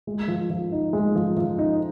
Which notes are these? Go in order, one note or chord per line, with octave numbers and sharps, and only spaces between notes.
G#3
F3
F3
D#4
G#3
F3
F3
D#4